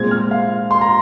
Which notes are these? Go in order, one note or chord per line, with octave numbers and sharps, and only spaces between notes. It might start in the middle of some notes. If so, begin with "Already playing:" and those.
Already playing: A#2 G#3 C4 G#6
F6
F5
C6
A#5